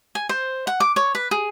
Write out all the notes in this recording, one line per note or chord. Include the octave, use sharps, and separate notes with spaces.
G#5
C5
F#5
D6
C#5
B4
G#4